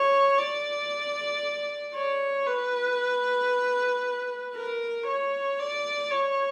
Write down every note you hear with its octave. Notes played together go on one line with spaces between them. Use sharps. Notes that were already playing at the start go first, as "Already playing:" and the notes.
Already playing: C#5
D5
C#5
B4
A#4
C#5
D5
C#5